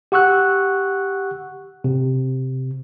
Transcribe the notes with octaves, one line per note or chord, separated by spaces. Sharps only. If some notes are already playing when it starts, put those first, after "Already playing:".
G4 F#5 C#6 E6 F#6
C3